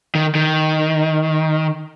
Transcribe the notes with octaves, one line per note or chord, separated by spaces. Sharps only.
D#3
D#3